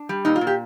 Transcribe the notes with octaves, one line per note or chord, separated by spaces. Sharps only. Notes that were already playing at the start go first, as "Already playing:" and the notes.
Already playing: D4
G3
A#2 D#4
F4
A#2
G4